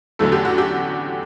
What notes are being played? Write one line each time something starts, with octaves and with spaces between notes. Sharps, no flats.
E2 D3 F#3 A3 A4
G4
F#4
G4